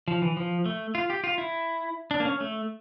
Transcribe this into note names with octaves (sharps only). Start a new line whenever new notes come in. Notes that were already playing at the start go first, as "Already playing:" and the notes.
F3
E3
F3
A3
F4
G4
F4
E4
D4
A#3
C#4
A3